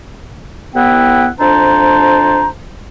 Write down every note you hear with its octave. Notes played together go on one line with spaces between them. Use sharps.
C2 B3 E4 F#5 G5
F2 D4 C5 A5 A#5